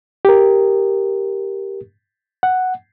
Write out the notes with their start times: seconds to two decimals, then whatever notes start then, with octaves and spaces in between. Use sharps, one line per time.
0.25 G4 A#4
2.43 F#5